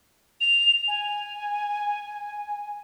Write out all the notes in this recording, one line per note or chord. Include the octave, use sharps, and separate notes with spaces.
F7
G#5